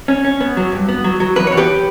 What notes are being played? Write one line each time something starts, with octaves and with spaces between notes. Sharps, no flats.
C#4
C#4
B3
F#3
G2
B3
F#3
F#3
E2 B4
C#5
E2
G4 B4